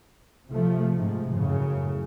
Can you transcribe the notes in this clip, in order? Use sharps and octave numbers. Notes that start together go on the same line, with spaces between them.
C3 F3 A3
G#2 C3 F3
F#2 A2 C#3